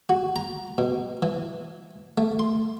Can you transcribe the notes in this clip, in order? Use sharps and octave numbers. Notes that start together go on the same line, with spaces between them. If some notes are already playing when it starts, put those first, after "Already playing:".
F#4
A#5
B2
E3
A3
C6